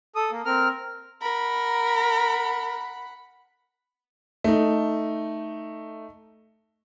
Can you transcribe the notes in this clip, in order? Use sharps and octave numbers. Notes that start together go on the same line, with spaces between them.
A4 D#6
A#3
C4 A#4 F6
A#4 F#5 B5
A3 D#4